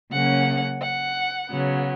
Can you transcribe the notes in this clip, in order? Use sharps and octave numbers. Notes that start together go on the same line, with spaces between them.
C#3 F#3 A#3 C#4 F#5
F#5
C#3 F#3 B3